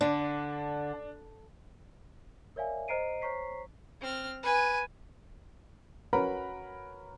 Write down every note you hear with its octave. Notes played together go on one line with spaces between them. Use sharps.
D3 D4
A#4 C#5 D5 E5 F5 G#5
C5 D#5 A#5 C7 D7 D#7
C5 C#5 A#5 C#6 B6 C7
C4 F6
B4 G#5
C#4 F#4 A#4 B4 A#5 B5